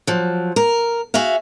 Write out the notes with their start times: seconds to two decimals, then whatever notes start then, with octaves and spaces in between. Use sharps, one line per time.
0.07 F3 F#3
0.56 A#4
1.14 F#4 G#4 E5 F5